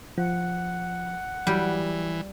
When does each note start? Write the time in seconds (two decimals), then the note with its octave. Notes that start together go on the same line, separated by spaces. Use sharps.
0.18 F3 F#5
1.47 E3 F#3 G3 G4